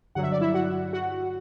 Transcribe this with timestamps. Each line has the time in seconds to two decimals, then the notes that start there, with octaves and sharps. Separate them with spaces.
0.15 G2 D3 F#3 F#5
0.23 E5
0.32 D5
0.41 E4 E5
0.54 F#4 F#5
0.93 F#4 F#5